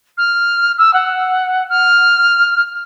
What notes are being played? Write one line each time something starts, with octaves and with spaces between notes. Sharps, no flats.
F6
E6
F#5
F6